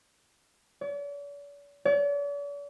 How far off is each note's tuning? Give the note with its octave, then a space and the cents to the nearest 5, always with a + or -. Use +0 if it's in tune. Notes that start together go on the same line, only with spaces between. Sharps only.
D5 -45
D5 -45